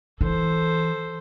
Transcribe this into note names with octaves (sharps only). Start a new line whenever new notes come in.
E3 A4 C5